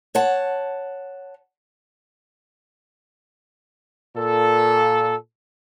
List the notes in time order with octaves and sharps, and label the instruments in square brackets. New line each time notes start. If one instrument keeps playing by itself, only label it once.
[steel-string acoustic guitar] C#5 F#5 A5
[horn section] A#2 A4